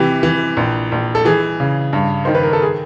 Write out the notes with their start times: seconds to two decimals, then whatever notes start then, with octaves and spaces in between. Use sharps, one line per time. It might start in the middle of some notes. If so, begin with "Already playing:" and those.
Already playing: C3 E3 G4
0.23 E3
0.57 A#1
0.92 A#1
1.15 A4
1.25 E3 G#4
1.60 C#3
1.93 G2
2.25 D#3 C5
2.35 B4
2.43 A#4
2.53 A4
2.62 G#4